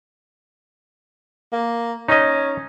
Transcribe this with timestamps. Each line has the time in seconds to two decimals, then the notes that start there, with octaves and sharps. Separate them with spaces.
1.52 A#3
2.08 C#4 D#4 D#5